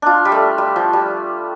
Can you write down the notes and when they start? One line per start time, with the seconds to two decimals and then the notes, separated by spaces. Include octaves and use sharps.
0.02 D4 F4
0.25 G3
0.32 A3
0.58 G3
0.76 F3
0.93 G3